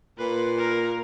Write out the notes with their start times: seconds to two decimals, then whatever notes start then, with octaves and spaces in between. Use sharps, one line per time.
0.19 A#2 B4
0.58 A#4